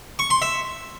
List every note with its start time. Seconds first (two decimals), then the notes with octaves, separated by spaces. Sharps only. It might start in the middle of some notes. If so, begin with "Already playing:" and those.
0.19 C#6
0.30 C6
0.42 E5